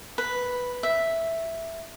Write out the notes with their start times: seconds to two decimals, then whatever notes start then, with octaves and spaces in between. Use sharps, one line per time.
0.18 B4
0.83 E5